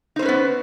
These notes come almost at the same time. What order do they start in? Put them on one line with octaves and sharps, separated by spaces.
D#4 C5 C#4 B4 B3